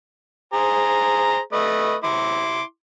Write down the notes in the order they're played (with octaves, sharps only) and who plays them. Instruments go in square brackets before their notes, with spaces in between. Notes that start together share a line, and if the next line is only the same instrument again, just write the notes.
[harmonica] G#4 C5 A#5
A3 B4 D#5
E4 C6 D6